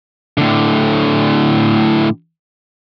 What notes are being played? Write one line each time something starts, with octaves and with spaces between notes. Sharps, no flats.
A2 D3